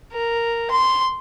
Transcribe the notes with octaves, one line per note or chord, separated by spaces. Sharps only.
A#4
C6